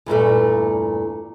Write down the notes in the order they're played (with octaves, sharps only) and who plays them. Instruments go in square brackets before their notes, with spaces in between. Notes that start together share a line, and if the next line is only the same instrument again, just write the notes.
[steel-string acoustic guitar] E2 G2 A#2 A3